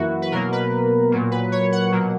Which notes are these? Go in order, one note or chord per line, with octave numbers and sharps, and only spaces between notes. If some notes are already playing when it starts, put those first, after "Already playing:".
Already playing: F#2 E3 A#3 E4 F#4
B4
B2 F#3 A#3 A#4
B4
A#2 F#3 A#3
B4
C#5
F#5
B2 F#3 A#3